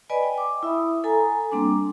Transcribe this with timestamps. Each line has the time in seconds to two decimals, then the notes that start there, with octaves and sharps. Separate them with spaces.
0.10 B4 D5 D#5 G#5 B5
0.23 G5
0.38 D6
0.63 E4 E5 B5 D#6
1.04 A4 G#5 A#5
1.51 G3 A#3 C4 D4 D6